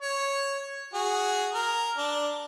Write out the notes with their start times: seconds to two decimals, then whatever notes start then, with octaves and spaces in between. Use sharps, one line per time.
0.02 C#5
0.94 F#4 G#4
1.54 A#4
1.97 D4